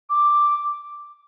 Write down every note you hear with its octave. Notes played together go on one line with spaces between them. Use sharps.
D6